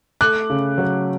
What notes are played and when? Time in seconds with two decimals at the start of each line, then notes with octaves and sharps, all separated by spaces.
0.21 A3 D6 F#6
0.50 C#3
0.78 F#3